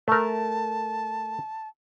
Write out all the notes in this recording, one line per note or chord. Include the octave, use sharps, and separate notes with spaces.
A3 A#4 A5